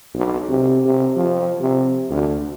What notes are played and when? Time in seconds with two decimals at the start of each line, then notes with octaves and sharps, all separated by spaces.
0.14 B1
0.49 C3
0.85 C3
1.16 F3
1.60 C3
2.10 D2